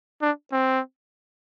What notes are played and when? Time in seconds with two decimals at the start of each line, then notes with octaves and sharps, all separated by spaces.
0.22 D4
0.52 C4